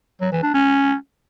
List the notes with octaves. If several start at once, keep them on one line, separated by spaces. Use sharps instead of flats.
F#3
E3
D4
C#4